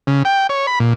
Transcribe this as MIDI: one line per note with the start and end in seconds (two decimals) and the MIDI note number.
0.07 0.23 49
0.25 0.47 79
0.49 0.67 73
0.67 0.79 83
0.80 0.93 46